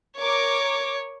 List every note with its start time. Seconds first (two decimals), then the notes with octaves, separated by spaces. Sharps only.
0.19 A#4 C#5 D6